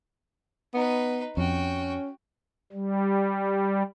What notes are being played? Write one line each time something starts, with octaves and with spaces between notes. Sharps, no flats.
B3 D#4 B4
F2 C#4 F#4 G5
G3